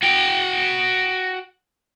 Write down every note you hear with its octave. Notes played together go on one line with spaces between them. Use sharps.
F#4 G5